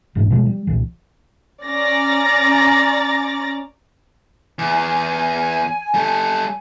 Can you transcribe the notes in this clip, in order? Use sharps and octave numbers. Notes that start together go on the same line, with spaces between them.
E1 G#2 E3 D4
B2 F3 G#3
G3
C2 A#2 E3
C#4 D5 A#5 A6 A#6
E2 G#5
G3 A4